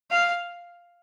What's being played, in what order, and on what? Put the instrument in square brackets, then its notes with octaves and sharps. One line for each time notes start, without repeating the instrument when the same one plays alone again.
[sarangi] F5